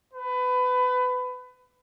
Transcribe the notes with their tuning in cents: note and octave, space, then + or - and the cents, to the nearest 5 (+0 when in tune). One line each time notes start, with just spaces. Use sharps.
B4 +25